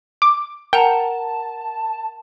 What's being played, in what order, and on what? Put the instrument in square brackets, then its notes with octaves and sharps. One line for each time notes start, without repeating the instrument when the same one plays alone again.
[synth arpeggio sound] D6
[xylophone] A#4 F#5 A#5 [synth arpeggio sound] G5 [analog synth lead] A5